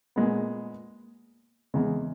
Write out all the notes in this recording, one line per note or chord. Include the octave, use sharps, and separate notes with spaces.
A#2 G#3 B3
E2 C#3 G#3